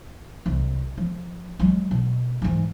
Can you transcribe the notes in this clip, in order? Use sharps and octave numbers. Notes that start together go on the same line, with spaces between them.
C2
F3
F#3 G#3
B2
G#2 E3